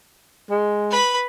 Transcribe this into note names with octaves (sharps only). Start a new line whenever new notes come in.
G#3
B4 B5